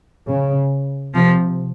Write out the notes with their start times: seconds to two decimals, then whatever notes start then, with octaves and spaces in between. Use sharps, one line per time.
0.28 C#3
1.14 C3 F3